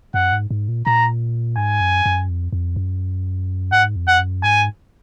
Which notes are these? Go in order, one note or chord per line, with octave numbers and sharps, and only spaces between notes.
F#2 F#5
G#2
G#2
A#2
A#2 A#5
G#2 G#5
F#2
F#2
F2
F2
F#2
G#2 F#5
F2
F#5
F#2
G#2 G#5